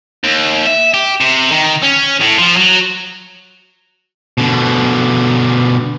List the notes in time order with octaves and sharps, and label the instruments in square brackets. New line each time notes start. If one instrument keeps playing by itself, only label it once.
[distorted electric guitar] D#2
E5
G4
C3
D#3
C#4
A2
F3
F#3
B2 D3